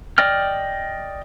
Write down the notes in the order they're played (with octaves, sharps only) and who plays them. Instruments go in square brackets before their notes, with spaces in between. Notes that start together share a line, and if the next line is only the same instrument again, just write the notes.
[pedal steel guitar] D5 D#5 G5 F6